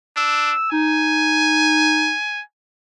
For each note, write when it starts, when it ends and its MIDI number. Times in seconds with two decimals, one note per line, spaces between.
0.17 0.53 62
0.17 0.71 88
0.72 2.13 63
0.72 2.42 80